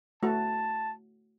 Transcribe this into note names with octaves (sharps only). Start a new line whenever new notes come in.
A3 F#4 A5